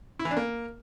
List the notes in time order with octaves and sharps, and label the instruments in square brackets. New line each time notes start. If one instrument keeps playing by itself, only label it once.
[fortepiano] E4
E3
D4
A#3